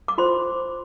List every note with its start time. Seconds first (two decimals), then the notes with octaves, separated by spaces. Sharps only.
0.08 D6
0.18 F4 C5 C6